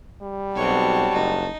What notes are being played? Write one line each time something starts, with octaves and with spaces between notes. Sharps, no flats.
G3
B1 C4 F#4 C#5 A5
F#1 D#4